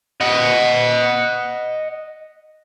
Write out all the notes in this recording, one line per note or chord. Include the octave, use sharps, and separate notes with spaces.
D#5 F#5